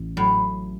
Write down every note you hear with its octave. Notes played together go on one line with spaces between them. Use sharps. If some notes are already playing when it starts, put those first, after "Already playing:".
Already playing: A1
A2 F#3